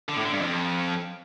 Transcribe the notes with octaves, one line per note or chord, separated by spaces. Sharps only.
D3
A2
D3
G2
F2